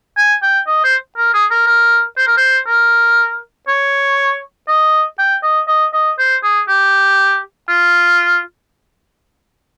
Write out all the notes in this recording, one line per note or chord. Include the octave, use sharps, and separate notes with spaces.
G#5
G5
D#5
C5
A#4
G#4
A#4
A#4
C5
A#4
C5
A#4
C#5
D#5
G5
D#5
D#5
D#5
C5
G#4
G4
F4